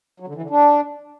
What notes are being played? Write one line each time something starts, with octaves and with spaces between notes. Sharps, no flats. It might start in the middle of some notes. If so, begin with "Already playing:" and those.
F#3
D3
E3
D3
D4